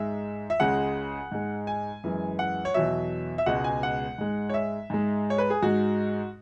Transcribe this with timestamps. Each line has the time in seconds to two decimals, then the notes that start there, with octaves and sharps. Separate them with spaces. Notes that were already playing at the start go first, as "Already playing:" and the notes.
Already playing: G#2 G#3 E5
0.50 E5
0.60 C#2 C#3 G#3 F#5
1.32 G#2 G#3
1.67 G#5
2.04 F#2 E3 G#3
2.39 F#5
2.65 C#5
2.74 E2 B2 F#3 E5
3.38 E5
3.46 C#2 B2 G#3 F#5
3.64 G#5
3.83 F#5
4.18 G#2 G#3
4.49 C#5
4.54 E5
4.90 G#2 G#3
5.30 C#5
5.38 B4
5.50 G#4
5.62 G#2 G#3 F#4